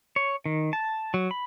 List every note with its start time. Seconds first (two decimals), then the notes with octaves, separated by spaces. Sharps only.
0.16 C#5
0.46 D#3
0.73 A5
1.14 F#3
1.31 B5